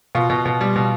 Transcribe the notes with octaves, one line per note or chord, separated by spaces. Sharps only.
B2 F4
B2
B2
G3
B2